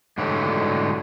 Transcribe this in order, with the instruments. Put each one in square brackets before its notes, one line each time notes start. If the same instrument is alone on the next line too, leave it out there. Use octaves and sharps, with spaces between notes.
[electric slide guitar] G#2 D3 E3 F#3 G3 A3